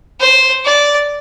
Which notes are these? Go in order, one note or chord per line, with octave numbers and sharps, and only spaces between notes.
C5
D5